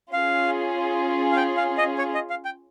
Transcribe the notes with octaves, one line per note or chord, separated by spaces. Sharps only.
C#4 F4 G#4 F5
F5
G5
F5
D#5
C#5
D#5
F5
G5